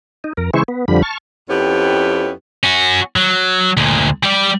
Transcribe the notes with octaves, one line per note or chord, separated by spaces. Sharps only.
D#4
F2 A#4
C#3 E3 G#3 E4 C5 C#6
B3
F2 D3 F3 G3 B5
A5 C#6 F6
F2 B3 C#4 E4 G4
C#4 F#4
F#3
D2 A#2
G3 D5